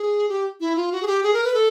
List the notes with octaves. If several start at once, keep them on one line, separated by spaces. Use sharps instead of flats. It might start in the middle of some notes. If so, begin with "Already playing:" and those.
Already playing: G#4
G4
E4
F4
F#4
G#4
G4
G#4
A#4
B4
A4